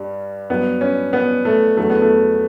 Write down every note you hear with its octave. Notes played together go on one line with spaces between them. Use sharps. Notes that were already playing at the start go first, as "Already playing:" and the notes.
Already playing: G2 G3
G2 F#3 B3
C#4
B3
A3
E2 D3 F#3 A3
B3
A3